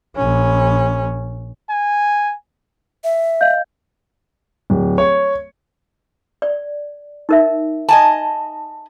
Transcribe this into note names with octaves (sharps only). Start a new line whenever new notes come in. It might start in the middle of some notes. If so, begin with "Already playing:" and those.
A#1 C#4
G#5
E5
D#5 F5 G6
D1
C#5
D5
D#4 A#4 E5
D#5 G#5 A5